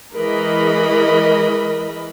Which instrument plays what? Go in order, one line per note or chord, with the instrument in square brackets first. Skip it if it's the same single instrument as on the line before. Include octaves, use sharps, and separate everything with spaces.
[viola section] E3 G#3 A#4 D#5 B5